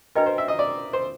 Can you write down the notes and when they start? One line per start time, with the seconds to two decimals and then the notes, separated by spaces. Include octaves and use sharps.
0.15 D4 F#4 A#4 B4 D#5 G5
0.26 C5
0.38 E5
0.48 D#5
0.59 D5
0.93 C5